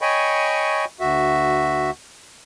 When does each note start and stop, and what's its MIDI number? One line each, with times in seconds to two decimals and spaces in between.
0.01 0.85 73
0.01 0.85 75
0.01 0.85 79
0.01 0.85 80
0.01 0.85 83
0.01 0.85 85
1.00 1.90 38
1.00 1.90 66
1.00 1.90 76